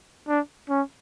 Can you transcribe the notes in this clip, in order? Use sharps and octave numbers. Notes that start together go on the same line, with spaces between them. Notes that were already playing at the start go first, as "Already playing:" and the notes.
D4
C#4